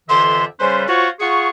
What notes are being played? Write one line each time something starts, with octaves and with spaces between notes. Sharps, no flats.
F2 D3 E3 G4 E5 C6
C#3 G3 C#4 B4 C5
F4 F#4 C5 C#5 F#5 C#6
F4 G#4 F#5 C#6